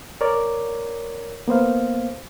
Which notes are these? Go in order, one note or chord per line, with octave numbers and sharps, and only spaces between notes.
A#4 C#5 D5
A#3 B3 C5 F5